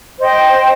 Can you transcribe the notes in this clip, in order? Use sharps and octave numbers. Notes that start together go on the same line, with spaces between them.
C5 D#5 G5